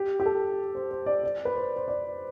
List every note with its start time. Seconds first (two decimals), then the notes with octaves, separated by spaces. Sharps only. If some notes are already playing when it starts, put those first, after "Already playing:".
Already playing: G4
0.20 G4
0.26 A4
0.75 C5
0.91 C5
1.06 D5
1.23 D5
1.45 B4
1.55 C5
1.76 C5
1.88 D5